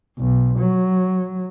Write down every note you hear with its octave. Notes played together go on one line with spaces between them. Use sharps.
B1
F#3